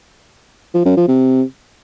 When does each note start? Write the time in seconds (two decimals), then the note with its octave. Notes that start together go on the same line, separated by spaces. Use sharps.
0.74 F3
0.85 F#2
0.97 F3
1.08 C3